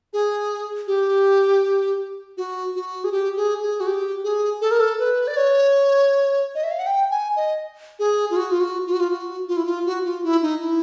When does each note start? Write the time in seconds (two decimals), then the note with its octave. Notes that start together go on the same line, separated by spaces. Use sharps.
0.13 G#4
0.87 G4
2.37 F#4
2.75 F#4
3.04 G#4
3.12 G4
3.37 G#4
3.62 G#4
3.80 F#4
3.87 G4
4.24 G#4
4.61 A4
4.71 A#4
4.80 A4
4.99 B4
5.27 D5
5.37 C#5
6.55 D#5
6.64 E5
6.71 F5
6.79 F#5
6.87 G5
7.11 G#5
7.36 D#5
7.99 G#4
8.31 F4
8.36 F#4
8.51 F4
8.61 F#4
8.86 F4
8.93 F#4
9.00 F4
9.11 F#4
9.48 F4
9.57 E4
9.65 F4
9.86 F#4
10.05 F4
10.24 E4
10.42 D#4
10.60 E4